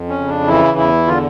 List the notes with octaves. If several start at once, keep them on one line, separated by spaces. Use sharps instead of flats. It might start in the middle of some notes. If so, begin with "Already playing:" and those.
Already playing: F2
C#4
C#3
D4
E3 E4
E2 E4
D3 F4